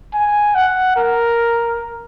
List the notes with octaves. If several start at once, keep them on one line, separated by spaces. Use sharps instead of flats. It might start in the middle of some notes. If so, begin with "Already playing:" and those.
G#5
F#5
A#4